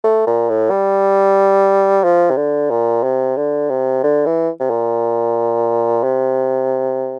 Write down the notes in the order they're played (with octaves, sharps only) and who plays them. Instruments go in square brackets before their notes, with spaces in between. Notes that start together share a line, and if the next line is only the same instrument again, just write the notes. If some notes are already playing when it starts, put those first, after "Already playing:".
[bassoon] A3
A#2
A2
G3
F3
C3
D3
A#2
C3
D3
C3
D3
E3
C3
A#2
C3